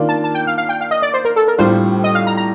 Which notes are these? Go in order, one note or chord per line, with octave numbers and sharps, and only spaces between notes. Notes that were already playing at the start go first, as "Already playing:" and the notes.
Already playing: D#3 A#3 D4 F4
A5
A5
G5
F5
F5
G5
F5
D#5
D5
C5
A#4
A4
A#4
A2 G3 D4 F4 C5
D#5
F5
A#5
A#5